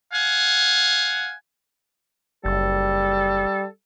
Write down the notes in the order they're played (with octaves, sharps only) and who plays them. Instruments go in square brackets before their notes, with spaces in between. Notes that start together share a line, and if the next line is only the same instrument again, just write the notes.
[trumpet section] F5 F#5 G#5
[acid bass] F#1 [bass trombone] G3 [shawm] A4